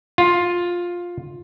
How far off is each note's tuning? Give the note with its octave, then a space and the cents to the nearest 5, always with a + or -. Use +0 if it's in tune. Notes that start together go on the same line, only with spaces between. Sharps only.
F4 +10